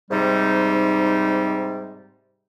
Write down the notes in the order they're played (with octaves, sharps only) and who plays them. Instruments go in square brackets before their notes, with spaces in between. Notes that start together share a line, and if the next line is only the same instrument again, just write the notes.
[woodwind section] G#2 C3 G3 C4 D#4